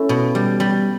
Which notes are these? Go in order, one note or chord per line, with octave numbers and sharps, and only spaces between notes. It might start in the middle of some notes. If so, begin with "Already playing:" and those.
Already playing: A3 C#4 E4
B2
G3
G3